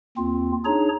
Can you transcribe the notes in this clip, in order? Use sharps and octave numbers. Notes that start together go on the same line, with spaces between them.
D#2 C4 F4
D4 D#4 G#4 C#5 A#5